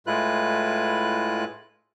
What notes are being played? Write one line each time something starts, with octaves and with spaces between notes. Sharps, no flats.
A2 G#3 E4 F4 B4 F#6